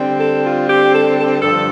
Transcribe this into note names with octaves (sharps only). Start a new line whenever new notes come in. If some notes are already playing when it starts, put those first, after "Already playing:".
Already playing: D3 G3 C4
A4
F4
G4
A4
G4
A4
G2 D3 F3 A4